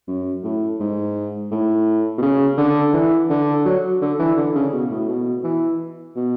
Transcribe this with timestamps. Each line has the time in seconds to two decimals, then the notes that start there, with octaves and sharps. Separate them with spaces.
0.08 F#2
0.44 A2
0.80 G#2
1.51 A2
2.18 B2
2.22 C#3
2.58 D3
2.94 E3
3.30 D3
3.66 F#3
4.01 D3
4.19 E3
4.37 D3
4.55 C#3
4.73 B2
4.91 A2
5.08 B2
5.44 E3
6.16 B2